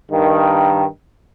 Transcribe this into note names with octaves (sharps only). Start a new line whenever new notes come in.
G2 D#3